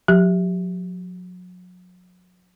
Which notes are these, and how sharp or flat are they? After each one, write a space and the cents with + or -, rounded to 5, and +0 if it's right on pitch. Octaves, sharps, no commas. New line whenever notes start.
F#3 -35 G4 +0